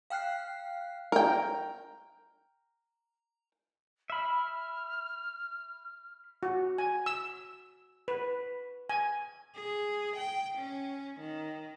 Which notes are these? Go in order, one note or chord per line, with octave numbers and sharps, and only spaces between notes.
F5 G5 F6 F#6 C7
A#4 G5
E5 B5 F6
F#4
G#5
E6
B4
G#5
G#4
G5
C#4
D#3